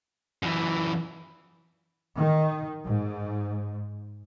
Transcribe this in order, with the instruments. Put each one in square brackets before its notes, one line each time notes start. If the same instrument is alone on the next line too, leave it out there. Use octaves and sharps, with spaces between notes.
[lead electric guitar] F#2 E3
[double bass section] D#3
G#2